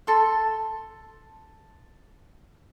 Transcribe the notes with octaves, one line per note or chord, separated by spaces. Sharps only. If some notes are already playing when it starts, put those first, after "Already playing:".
A4 C6